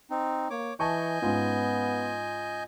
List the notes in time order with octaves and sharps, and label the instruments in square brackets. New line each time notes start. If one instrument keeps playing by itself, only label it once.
[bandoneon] C4 D#4
[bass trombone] A#3 [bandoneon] C#5 D6
[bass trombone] E3 [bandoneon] D#5 G#5 G6 [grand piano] A5 C#6
[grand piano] G#2 C#4 F4 [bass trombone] B3